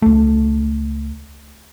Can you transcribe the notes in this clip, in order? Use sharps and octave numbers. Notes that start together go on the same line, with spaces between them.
C#2 A3